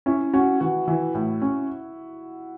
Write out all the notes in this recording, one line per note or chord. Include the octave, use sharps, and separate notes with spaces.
C#4 E4
C#4 F#4
E3 F#4
E3 E4
A2
C#4